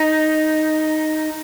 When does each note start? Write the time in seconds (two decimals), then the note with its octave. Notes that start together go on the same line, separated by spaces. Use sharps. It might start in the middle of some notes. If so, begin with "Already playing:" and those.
Already playing: D#4